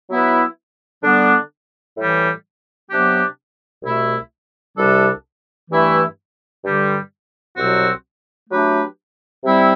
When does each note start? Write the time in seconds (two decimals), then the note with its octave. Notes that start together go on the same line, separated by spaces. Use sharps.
0.09 F#3 B3 E4 B4
1.03 D3 G3 B3 D4
1.96 A2 E3 G3
2.89 C3 F#3 B3 D4 G4
3.82 C2 B2 A3 E4
4.76 C2 C3 G3 D4 A4
5.70 G2 E3 A3 E4
6.63 G2 D3 G3
7.56 C2 B2 F#3 C4 F#4
8.49 F#3 A3 D4 G4 B4
9.44 C3 G3 C4 E4